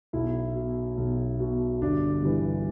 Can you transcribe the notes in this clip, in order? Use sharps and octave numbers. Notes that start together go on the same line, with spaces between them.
B1 E4
B2
B1
B2
G1 D4
G2 E3